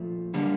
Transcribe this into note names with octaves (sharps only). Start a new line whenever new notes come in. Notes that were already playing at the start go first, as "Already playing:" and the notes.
Already playing: A#2 F3 A3
D3 G3 A#3